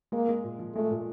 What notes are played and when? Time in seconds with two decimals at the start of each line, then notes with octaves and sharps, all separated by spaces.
0.12 G#3 A#3
0.28 G#3
0.44 A#2
0.59 F3
0.75 G#3 A3
0.90 A#2